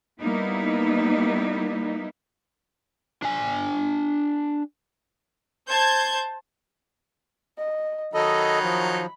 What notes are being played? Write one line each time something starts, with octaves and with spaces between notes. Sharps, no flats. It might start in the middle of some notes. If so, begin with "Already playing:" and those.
G3 A#3 B3 D#4 E4
D4 G#5
C5 A5 G6 G#6
D#5
D#3 F#3 D#4 A4 D#5 B5
F3